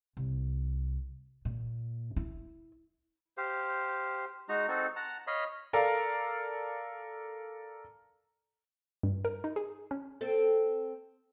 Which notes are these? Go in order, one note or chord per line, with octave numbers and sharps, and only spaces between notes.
C2
A#2
E4
G4 C5 F5
G#3 D#4 F#4 A#5
C4 D#4 F#4 A4
F#5 A5 A#5
C#5 D#5 F5 B5
A4 A#4 D5 F5
G2
A#4
D#4
G#4
C#4
C4 A4